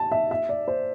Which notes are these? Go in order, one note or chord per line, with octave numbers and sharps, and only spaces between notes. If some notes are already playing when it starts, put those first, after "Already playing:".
Already playing: A5
E5
E5
D5
C5